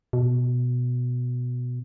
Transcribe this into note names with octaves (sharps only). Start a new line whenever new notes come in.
B2